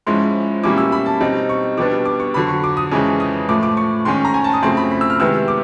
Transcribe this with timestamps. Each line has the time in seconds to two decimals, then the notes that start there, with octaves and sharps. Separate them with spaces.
0.07 G#2 F3 G#3 C#4 E4 C6
0.63 B2 G3 A#3 C#4 E4 D6
0.78 E6
0.92 B5
1.06 A5
1.20 B2 G3 C4 D#4
1.49 C#6
1.77 B2 G3 B3 D4 D6
2.05 D6
2.20 C#6
2.34 F2 D3 F#3 B5
2.49 C#6
2.64 D6
2.77 D#6
2.91 F2 C#3 E3 G#3 C#4 D#6
3.20 D#6
3.49 A2 F3 A3 D6
3.63 D6
3.77 C#6
4.05 G#2 D#3 G#3 C#4 C6
4.25 A#5
4.34 G#5
4.44 A5
4.53 D#6
4.62 F#2 C#3 F3 A3 C4 C6
4.77 B5
4.91 B5
5.01 E6
5.10 F6
5.20 C3 D#3 G#3 B3 E4 E6
5.48 D6